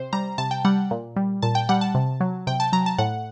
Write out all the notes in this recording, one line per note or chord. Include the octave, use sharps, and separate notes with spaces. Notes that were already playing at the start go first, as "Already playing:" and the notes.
Already playing: C3 C5
G3 A#5
C3 A5
G5
G3 F#5
A#2
G3
A#2 A5
G5
G3 F#5
A5
C3
F#3
C3 G5
A5
F#3 A#5
A5
A2 F#5